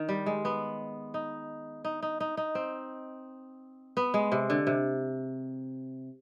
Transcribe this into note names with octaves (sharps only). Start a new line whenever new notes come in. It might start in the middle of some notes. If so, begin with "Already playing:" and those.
Already playing: D#3
G3
G#3
B3
D#4
D#4
D#4
D#4
D#4
C4
B3
G#3
C3
D3
C3